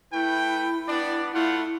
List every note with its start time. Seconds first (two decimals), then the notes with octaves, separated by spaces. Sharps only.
0.12 A3 E4 B4 G5
0.88 B3 D4 D5
1.33 A3 E4 F4 F#5